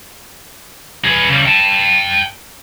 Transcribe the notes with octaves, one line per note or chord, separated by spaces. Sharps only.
G#4 B4
C#3 G3
G5 A5